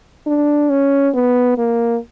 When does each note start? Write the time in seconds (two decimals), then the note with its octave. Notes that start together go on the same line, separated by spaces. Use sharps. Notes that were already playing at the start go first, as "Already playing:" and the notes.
0.27 D4
0.70 C#4
1.14 B3
1.58 A#3